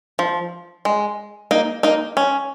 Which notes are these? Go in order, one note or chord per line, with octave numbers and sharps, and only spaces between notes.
F3
G#3
A#3 D#4
A#3 D#4
C#4